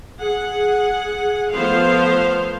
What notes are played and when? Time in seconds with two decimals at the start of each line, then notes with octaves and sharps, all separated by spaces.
0.22 G#4 F#5
1.55 F3 A3 B3 A4 C5 F5